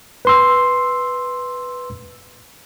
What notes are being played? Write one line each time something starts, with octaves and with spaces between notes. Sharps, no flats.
B4 C6 E6